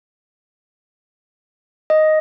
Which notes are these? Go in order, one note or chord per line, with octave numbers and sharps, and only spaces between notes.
D#5